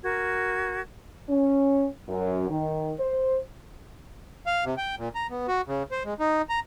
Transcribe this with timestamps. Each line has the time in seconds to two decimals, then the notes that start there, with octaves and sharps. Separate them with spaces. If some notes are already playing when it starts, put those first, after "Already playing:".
0.04 F#4 A#4 G#6
1.29 C#4
2.08 F#2
2.50 D#3
2.99 C5
4.47 F5
4.65 C3
4.78 G5
4.98 A#2
5.15 A#5
5.30 B3
5.48 F#4
5.67 C#3
5.91 C5
6.05 G#3
6.20 D#4
6.49 A#5